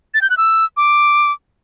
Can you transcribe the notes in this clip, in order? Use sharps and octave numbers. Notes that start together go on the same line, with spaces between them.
A6
G6
F#6
E6
D6